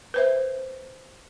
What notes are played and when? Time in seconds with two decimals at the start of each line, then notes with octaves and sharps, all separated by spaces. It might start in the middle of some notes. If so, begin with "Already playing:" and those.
0.14 B4 C5 E5